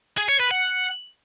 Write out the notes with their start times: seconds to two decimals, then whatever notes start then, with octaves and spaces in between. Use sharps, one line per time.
0.18 G#4
0.29 C#5
0.40 B4
0.51 F#5